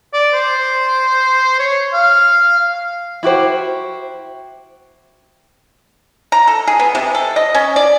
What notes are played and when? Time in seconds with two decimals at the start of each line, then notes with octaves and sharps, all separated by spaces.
0.13 D5
0.34 C5
1.60 C#5
1.94 F5
3.23 E4 F#4 G4 C5
6.32 A#5
6.47 A4
6.67 G#4
6.79 B3
6.95 C3
7.15 A4
7.36 D#5
7.55 C#4
7.76 D5